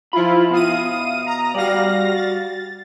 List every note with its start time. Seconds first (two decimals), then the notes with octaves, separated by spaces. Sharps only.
0.13 F3 E4 F4 B5
0.51 B2 E5 F5 D#6 D#7
1.26 A#5 D#6
1.54 G3 F#4 D5 F5 A#6
2.14 A6